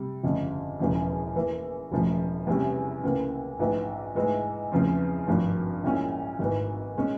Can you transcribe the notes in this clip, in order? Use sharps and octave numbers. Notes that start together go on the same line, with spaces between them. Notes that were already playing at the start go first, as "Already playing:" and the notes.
Already playing: C3 G3
G1 F2 C#3
E1 E2 C#3 F3
E2 E3 A#3
E1 E2 C#3 F3
E2 C3 G3 C#4
C#2 C#3 E3 A#3
A#1 G#2 E3
G#2 E3 G#3 E4
E2 C#3 F3 C4
G#1 G2 F3
A#1 A#2 G#3 C#4 E4
G#1 G#2 E3
A#2 G#3 C#4